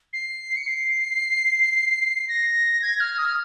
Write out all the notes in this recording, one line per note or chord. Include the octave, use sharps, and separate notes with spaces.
C7
C#7
C7
A#6
G#6
F6
D#6
F6